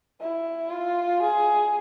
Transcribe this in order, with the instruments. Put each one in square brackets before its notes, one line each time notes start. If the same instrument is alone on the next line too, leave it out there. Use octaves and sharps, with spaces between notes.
[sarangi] E4
F4
G#4